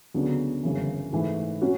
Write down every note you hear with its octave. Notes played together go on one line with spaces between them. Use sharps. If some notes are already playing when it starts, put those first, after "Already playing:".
D2 C#3 F#3 B3 D4
G1 F#2 C#3 E3
G#2 E3 A3
C#4 F#4